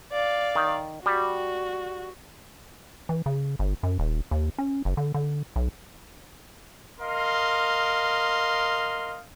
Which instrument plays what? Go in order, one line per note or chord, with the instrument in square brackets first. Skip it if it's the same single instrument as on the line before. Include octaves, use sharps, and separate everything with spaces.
[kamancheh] D5 F5
[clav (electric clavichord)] D#3
[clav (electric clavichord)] G3 [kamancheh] F#4
[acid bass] E3
C#3
G1
F#2
D#1
D#2
C#4
F#1
D3
D3
B1
[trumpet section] A#4 D#5 F5 C6